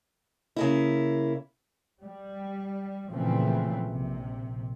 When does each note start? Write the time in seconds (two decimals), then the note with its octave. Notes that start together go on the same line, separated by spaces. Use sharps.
0.56 C#3 A#3 E4
2.03 G3
3.10 A#2 C#3 E3 F3 A3 C4
3.86 A#1 C3